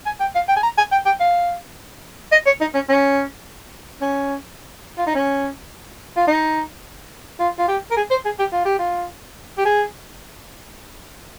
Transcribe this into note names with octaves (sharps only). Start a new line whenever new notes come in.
G#5
G5
F5
G5
G#5
A#5
G#5
G5
G5
F5
D#5
C#5
D#4
C#4
C#4
C#4
F4
D#4
C#4
F4
D#4
F4
F4
G4
A#4
G#4
C5
G#4
G4
F4
G4
F4
G4
G#4